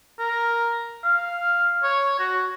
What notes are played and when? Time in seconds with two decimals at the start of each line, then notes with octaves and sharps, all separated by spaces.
0.19 A#4
1.04 F5
1.83 C#5
2.19 F#4